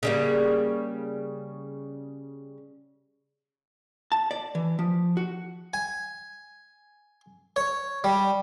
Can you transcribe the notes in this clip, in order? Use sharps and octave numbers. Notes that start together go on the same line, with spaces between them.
C#3 G3 A#3
A5
D5
E3
F3
F#4
G#5
C#5
G3